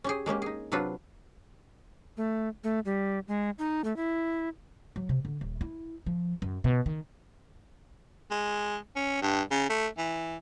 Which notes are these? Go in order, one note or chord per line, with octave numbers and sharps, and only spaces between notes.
C#4 G4 G#4
G#3 A#3 C#4 G4
D#4 G#4
C3 F#3 D4 F4 B4
A3
A3
G3
G#3
D#4
A3
E4
F#3
C3
D3
D#1
E4
F3
F#2
B2
D#3
G#3
C#4
G2
C#3
A3
E3